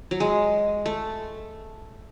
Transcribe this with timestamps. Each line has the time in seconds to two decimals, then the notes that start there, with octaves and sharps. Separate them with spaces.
0.11 F#3
0.20 G#3
0.86 A3